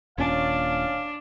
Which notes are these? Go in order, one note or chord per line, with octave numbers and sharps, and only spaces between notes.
D#1 A#2 C#4 D4 F5